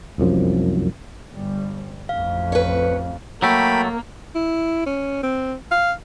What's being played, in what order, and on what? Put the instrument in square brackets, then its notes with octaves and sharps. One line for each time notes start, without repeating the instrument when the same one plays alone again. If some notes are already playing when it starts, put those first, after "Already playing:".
[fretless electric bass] F1 C2 F#2 F3
[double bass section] G1 G3
[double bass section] A1 F2 [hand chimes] F5
[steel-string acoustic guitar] B4 C#5
[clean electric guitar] F#3 A3 [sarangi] A#3 [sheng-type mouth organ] G5 B5
[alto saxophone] E4
C#4
C4
F5